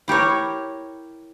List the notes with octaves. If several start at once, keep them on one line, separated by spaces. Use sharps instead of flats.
E4 G4 A#4 C#5